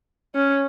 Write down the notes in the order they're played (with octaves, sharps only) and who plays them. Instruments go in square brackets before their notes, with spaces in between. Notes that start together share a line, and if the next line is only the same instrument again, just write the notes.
[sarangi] C#4